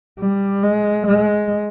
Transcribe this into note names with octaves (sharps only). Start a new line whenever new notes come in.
G3
G#3
G#3